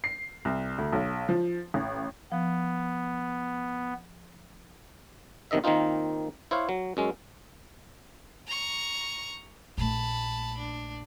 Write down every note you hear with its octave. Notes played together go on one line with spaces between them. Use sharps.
C7
C2
D2
B1
F3
A1
F3 B3
B1 C3 D#3 D#5 E5
D#3 A#3 C4 D#4 F4
E4 C5 C#5 F5
F#3
F#2 G#3 C#4
A#5 C#6
A#1 A3 A5 B5
D4